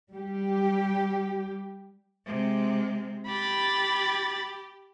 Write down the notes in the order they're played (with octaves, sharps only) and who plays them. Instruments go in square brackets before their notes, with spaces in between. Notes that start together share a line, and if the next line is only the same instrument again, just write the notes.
[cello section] G3 G4
[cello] C3 G#3
[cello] G4 [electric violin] B5 A6